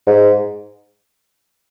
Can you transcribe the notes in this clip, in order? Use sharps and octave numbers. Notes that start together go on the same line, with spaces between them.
G#2